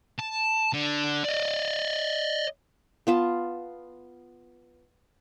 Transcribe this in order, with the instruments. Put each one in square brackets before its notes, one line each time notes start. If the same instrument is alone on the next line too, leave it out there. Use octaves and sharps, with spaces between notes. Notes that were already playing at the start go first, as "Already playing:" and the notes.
[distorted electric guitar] A5
D3
D5 D#5
[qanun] B3 F4 A5